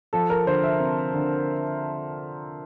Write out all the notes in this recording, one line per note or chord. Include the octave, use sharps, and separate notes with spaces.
F3 A4
A#4
D3 C5
E5
C4
D3